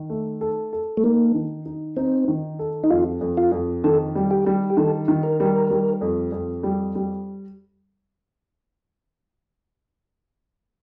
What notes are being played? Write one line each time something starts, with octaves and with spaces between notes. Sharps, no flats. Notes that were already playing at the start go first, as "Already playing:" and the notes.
Already playing: D#3
A3
A4
A4
A3
A#3 D#4
D#3
D#4
C4 D#4
D#3
A4
D#4
F2 F4
F2
F4
F2
D#3 A4
G3
G4
G3
G4
D#3 A4
D#3
A#4
G3
G3
F2
F2
G3
G3